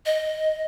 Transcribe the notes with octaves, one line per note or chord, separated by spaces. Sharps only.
D#5